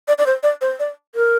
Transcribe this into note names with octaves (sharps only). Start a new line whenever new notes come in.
D5
D5
C5
D5
C5
D5
A#4